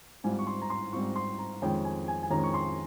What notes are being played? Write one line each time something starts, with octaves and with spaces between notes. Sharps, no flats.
G#2 G3 C4 F4 G#5
C#6
C6
A#5
C6
G#2 G3 C4 F4 C#6
C6
A#5
F2 D#3 G#3 C#4 G5
G#5
G#5
G#5
F2 D#3 G#3 C#4 A#5
C#6
C6